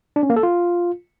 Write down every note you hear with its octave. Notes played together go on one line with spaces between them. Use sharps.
D4
C#4
A#3
A4
F4